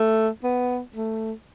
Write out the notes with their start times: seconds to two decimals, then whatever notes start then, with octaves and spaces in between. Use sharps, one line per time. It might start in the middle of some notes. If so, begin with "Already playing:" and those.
Already playing: A3
0.44 B3
0.96 A3